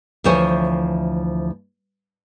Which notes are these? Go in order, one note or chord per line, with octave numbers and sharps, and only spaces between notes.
D2 E3 F3 C5 C#5 G#5